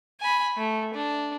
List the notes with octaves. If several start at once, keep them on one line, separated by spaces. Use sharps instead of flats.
G#5 B5
A3
D4